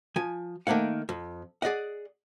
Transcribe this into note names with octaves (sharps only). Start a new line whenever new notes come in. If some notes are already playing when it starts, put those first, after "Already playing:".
F3 G#5
D#3 A3 A#3 F5 F#5
F2
G#4 D5 D#5 F#5